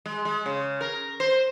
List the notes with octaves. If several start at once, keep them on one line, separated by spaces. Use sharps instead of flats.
G#3
G#3
C#3
A#4
C5